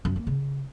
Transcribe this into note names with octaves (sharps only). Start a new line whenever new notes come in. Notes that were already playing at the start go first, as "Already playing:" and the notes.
F#2
A#3
C#3